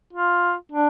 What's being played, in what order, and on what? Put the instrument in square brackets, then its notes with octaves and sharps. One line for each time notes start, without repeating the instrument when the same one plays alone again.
[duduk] F4
D4